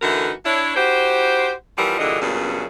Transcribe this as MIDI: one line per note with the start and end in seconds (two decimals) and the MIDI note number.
0.02 0.31 50
0.02 0.31 52
0.02 0.31 57
0.02 0.31 63
0.02 0.31 66
0.02 0.31 70
0.45 0.74 62
0.45 0.74 64
0.45 0.74 73
0.75 1.51 64
0.75 1.51 66
0.75 1.51 67
0.75 1.51 72
1.77 1.98 52
1.77 1.98 53
1.77 1.98 55
1.77 1.98 59
1.77 1.98 65
1.77 1.98 70
1.99 2.19 43
1.99 2.19 46
1.99 2.19 50
1.99 2.19 52
1.99 2.19 68
1.99 2.19 75
2.21 2.65 42
2.21 2.65 46
2.21 2.65 49
2.21 2.65 55
2.21 2.65 59
2.21 2.65 62